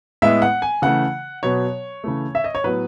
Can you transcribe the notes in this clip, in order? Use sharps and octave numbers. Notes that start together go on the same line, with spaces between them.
A2 G#3 B3 E5
F#5
G#5
C#3 E3 A3 F#5
B2 F#3 B3 C#5
C#3 E3 A3
E5
D#5
C#5
A2 F#3 B3 B4